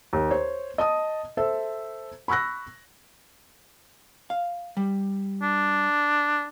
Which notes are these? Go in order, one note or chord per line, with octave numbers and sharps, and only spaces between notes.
D#2
C5 C#5
D#5 A5 D#6
A4 C5 E5
B5 C#6 E6 F#6 A#6
F5
G3
D4